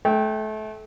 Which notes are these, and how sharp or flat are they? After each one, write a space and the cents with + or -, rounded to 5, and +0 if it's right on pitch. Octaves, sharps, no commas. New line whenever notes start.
A3 -30 G5 +0